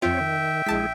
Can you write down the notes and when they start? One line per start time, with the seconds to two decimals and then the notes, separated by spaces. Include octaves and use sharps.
0.02 F2 C4 F4 C#5 E5 G5
0.21 D#3
0.66 A#1 G#3 E4 G#4 A5 B6